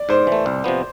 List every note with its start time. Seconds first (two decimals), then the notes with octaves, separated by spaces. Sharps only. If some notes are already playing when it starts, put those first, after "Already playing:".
Already playing: D5
0.09 G#2 C5
0.27 E3
0.32 A3
0.46 C2
0.64 C3 F3 B3